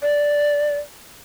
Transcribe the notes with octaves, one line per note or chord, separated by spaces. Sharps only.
D5